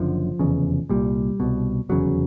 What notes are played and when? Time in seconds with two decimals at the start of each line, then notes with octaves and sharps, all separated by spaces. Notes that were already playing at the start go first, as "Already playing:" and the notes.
Already playing: F#1 F#2 D3 F3
0.39 F1 E2 C#3
0.90 C2 A#2 G3
1.40 C2 B2
1.89 F1 E2 C#3 F#3